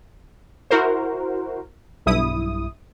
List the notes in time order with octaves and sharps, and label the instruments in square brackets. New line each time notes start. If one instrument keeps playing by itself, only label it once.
[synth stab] E4 F#4 A#4 C5
B1 G2 E4 D#6